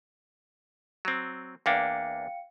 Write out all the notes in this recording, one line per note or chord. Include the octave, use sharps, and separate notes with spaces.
F#3 C4
E2 A#3 D4 F5 G5 C#7